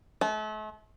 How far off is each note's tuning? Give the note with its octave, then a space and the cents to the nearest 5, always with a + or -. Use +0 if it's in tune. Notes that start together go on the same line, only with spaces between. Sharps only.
A3 -40